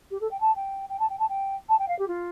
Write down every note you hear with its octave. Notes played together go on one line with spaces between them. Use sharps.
G4
A4
G5
A5
G5
G5
A5
G5
A5
G5
A5
G5
F5
G4
F4